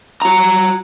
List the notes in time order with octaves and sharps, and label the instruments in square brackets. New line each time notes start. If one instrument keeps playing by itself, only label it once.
[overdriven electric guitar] F#4 A#5